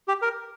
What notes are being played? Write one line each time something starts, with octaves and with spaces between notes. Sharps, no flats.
G4
A#4